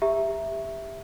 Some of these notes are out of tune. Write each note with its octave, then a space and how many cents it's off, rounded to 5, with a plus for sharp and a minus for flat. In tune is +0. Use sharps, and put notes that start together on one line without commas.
G4 +25 E5 +0 A#5 +0